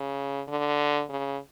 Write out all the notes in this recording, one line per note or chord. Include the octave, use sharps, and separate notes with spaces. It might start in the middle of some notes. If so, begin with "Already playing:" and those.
Already playing: C#3
D3
C#3